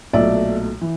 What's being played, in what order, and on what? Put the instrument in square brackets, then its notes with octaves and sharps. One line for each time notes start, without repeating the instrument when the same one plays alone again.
[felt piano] B1 A#2 F#3 A3 D5 E5
E3